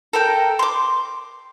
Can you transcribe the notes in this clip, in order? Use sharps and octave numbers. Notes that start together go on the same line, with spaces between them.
A4 A#4 G5
C6 D6